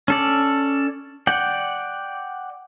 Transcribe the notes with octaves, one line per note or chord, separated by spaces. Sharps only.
C#4 A4 D5
D5 F#5 G5